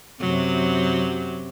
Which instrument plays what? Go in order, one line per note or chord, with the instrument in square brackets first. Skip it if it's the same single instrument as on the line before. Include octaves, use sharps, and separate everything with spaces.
[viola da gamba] F#2 C3 F#3